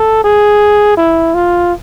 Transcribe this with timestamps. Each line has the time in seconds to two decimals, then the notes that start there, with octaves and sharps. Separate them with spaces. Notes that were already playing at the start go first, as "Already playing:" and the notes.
Already playing: A4
0.24 G#4
0.97 E4
1.34 F4